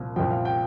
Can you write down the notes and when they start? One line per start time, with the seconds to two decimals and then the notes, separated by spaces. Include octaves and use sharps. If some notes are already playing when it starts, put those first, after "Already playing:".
Already playing: C2 A#2 F3
0.16 C2 A#2 F3 G5
0.30 F5
0.45 G5